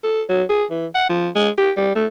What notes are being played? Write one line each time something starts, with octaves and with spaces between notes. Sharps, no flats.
A4
F#3
G#4
E3
F#5
F3
G#3
G4
G3
A3